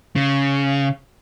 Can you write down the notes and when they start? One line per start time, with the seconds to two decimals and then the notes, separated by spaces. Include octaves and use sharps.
0.16 C#3